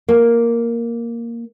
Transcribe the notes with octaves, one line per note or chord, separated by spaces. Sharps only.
A#3